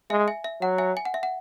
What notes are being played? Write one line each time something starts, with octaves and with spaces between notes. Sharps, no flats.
G#3 E5 G#5
E5 G#5
E5
F#3 F#5
E5 G#5
G#5
F#5
E5
F#5